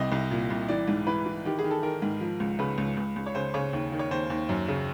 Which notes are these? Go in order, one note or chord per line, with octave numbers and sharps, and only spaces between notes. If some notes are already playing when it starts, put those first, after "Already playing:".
Already playing: C2 C3 D#5
C2
A#2
C2
E3 D5
G#2
E3 B4
E3
D#3 G4
G#4
D#3
A4
D#3 A#4
G#2
F3
C#2
C#3 B4
C#2
C#2
C#2
C#5
C#3 C5
C#3 C#5
D#2
D#3
C#5
D#2 C5
D#2
F#2
C#3